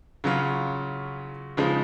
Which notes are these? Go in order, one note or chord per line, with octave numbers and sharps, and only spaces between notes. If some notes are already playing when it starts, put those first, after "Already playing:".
C#3 F#3 C#4 F4
C#3 F3 G#3 D#4